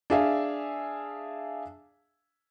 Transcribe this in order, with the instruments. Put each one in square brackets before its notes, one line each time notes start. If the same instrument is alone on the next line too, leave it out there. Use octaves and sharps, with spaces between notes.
[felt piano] D4 G#4 E5 F5